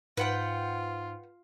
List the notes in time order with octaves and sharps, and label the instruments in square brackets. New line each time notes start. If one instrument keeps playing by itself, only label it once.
[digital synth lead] G#2 [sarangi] F4 [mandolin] B4 F#5 G5